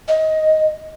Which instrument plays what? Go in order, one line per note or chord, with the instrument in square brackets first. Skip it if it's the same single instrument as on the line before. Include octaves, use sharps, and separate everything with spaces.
[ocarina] D#5